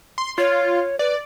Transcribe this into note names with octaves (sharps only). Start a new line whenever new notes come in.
C6
F4 C#5
B4 D5